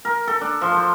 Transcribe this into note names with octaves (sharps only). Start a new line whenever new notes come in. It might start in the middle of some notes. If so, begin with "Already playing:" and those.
A#4
A4
D4
F3
C5